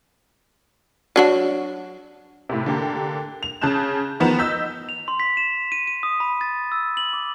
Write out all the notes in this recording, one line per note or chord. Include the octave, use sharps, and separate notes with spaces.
F#3 D4 F#4
A2 C3
D3 A#3 G4
F7
C#3 A5 F#6 G6 E7
D#3 F3 B3 B4 A#5 E7
D#5 E6 G6 B6
F7
C6
B6
E7
D#7
D#7
D#6
B5
A6
E6
F#7
D6